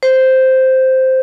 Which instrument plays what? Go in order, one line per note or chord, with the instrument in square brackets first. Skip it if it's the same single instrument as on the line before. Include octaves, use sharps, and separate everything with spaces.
[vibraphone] C5